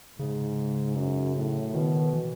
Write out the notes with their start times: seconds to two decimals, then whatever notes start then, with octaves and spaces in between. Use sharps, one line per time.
0.19 G#2 C#3
0.96 F#2
1.36 A2
1.74 B2 D#3
2.13 E3